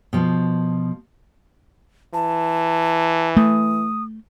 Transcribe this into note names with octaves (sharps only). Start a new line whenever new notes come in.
B2 F3
E3 A5
A3 D#6